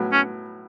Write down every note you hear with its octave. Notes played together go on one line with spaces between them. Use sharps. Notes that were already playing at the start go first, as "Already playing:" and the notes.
Already playing: A2 F#3 B3
C#4